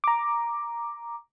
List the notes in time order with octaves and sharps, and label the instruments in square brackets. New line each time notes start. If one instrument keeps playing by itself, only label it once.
[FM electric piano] A#5 D6